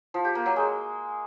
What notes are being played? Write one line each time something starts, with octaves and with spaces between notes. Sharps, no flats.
F3
G4
A#3
F#3
G#3